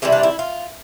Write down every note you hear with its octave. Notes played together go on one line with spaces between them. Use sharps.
C3 E3 G3 E4
D4
E4
F4